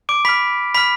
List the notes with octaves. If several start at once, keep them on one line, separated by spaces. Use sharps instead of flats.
D6 D7
B5 D6 F6 B6
B5 F6 B6